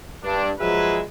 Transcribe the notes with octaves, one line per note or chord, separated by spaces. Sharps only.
G2 D4
F3 F#3 G#3 G#4 B4 E5